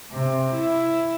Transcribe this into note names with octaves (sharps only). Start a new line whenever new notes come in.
C3
E4